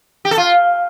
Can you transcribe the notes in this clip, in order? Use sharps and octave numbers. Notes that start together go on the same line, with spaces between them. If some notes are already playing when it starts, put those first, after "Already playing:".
G4
A4
F4